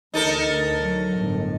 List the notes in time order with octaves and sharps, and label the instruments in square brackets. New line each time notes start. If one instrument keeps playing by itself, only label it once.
[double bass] D2 [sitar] D#4 A4 A#4
[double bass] D2
F#3
G1 A2